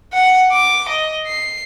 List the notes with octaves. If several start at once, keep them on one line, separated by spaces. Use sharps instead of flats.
F#5
D6
D#5
C7